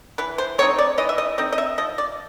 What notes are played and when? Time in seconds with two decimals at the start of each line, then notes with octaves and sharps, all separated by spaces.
0.18 E3 B4
0.38 C5
0.58 A3 C4 D#4 C#5
0.78 D5
0.98 E3 D#5
1.09 E5
1.18 D#5
1.38 A3 C4 D#4 D#5
1.53 D#5
1.58 E5
1.78 F3 D#5
1.98 D5